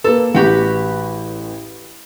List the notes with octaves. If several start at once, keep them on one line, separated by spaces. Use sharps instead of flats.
A#3 A4 B4
A1 F#4 G4 B4